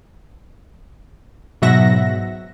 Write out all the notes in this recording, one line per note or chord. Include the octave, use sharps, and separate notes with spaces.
G#2 B2 F#3 E5 F#5 A#6